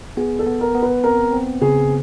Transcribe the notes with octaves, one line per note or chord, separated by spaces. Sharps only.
B3 G#4
A4
B3
A#4
B3
B4
C4 A#4
C4
C#3 G#4